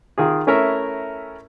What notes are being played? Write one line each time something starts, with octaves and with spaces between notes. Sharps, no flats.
D#3 F4 G#4
A3 C#4 E4 A#4 E5